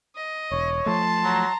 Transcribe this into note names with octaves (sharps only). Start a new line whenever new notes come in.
D#5
E1 C#5
F3 A3 A5 C6
F#3 A#5